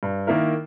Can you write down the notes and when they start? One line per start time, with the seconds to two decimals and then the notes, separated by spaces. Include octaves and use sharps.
0.03 G2
0.27 D#3 A#3 E4 A#4